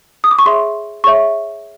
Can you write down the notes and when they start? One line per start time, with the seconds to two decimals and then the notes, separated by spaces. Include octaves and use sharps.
0.24 D#6
0.31 D6
0.39 C#6
0.46 G#4 C#5 E5 C6
1.04 G#4 C#5 E5 C#6